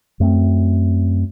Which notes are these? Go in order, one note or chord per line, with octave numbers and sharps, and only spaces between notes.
F#2 A3 A#3 C4